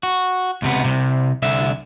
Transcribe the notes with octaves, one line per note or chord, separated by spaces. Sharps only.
F#4
C#2 C3 B3
C2 C3
C2 D3 E5